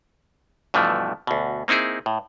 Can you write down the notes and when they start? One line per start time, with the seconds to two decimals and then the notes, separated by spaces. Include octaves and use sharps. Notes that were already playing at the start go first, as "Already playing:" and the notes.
0.74 G2 B2 E3 F3 A3
1.27 D2 B2
1.68 A#3 C4 D#4 E4 G#4
2.06 A2